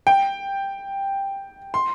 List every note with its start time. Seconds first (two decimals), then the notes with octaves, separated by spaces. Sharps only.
0.07 G5
1.74 C6